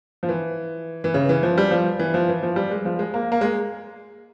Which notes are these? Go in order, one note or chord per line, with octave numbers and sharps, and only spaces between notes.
F3
E3
E3
C#3
E3
F3
G3
F3
E3
F3
E3
F3
G3
G#3
F3
G#3
A#3
A#3
G#3